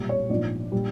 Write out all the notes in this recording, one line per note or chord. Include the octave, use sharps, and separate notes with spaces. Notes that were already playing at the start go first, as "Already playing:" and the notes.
Already playing: B1 A#2 G3
C#5
A#1 G#2 F3 D5
A#2 G3